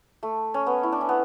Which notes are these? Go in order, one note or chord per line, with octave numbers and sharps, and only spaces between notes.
A3
C#4
B3
E4
D4
C#4
B3